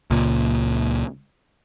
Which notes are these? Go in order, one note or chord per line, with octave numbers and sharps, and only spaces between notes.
C#2 A#2